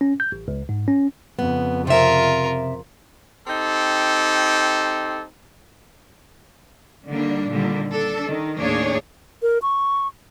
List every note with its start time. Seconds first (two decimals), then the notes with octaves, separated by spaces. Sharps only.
0.01 C#4
0.20 G6
0.32 A1
0.48 C#2
0.69 G#2
0.88 C#4
1.39 F2 C#3 B3
1.87 C3 F4 A#4 E5
3.46 C4 D#4 G4 A4
7.08 D3 D#3 G3 A#3 D4
7.49 A#2 D3 D#3 G3
7.89 D4 A4
8.27 D#3
8.60 D#2 A2 A#3 D4 G#4 C#5
9.42 A#4
9.62 C#6